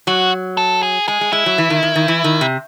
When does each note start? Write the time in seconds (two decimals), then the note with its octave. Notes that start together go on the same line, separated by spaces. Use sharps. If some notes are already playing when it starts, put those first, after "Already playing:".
0.07 F#3 F#4
0.57 A4
0.83 G#4
1.08 G#3 G#4
1.21 G#3
1.33 G#3 E4
1.46 F#3
1.58 E3
1.70 D#3
1.83 D#3
1.96 D#3
2.08 E3
2.24 D#3
2.41 C3